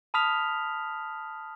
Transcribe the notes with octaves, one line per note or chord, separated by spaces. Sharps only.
A5 B5 D#6 F6 B6 F7